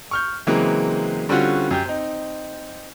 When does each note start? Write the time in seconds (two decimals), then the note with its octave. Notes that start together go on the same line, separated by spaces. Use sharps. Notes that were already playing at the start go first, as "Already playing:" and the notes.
0.11 C#6 F6 G6
0.47 C#3 E3 F#3 G#3 A#3 C4
1.29 D3 G3 C4 C#4 F4 F#4
1.71 F#2 G4 G6
1.86 C4 D#4